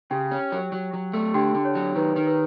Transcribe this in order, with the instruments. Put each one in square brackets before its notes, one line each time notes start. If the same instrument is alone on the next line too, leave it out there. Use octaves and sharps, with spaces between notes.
[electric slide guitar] C#3 [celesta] G4 G5
[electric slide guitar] C#4
F#3
F#3
F#3
A3
[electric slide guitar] D3 [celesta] G4 G5
[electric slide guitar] D3
[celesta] C#5
[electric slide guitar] F#3
[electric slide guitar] D#3 [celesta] B4
[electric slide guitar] D#3
[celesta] B4